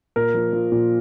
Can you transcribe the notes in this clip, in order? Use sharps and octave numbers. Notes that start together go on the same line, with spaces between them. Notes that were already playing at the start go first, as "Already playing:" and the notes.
A#2 A#4
F3
F3
A#2